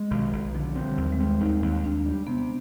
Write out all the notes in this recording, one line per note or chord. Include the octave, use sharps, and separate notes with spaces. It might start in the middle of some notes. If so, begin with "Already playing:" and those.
Already playing: G#3
B1 D#3
B1
D3 F3
C4
G3
D#2
G#3
C4
D#2 D#4
D#2
D#2 D4
G3
C3 B3